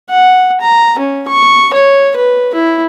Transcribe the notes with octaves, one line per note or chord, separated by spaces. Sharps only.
F#5
A#5
C#4
C#6
C#5
B4
E4